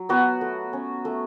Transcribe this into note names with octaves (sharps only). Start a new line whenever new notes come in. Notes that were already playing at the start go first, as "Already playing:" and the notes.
Already playing: F#3
B3 F#4
A3
C#4
A3